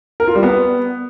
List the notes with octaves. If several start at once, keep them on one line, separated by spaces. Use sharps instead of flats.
A#4
F4
G3
B3